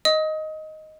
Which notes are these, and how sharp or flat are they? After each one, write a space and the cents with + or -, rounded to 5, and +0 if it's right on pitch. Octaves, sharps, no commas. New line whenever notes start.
D#5 +0 D#6 +30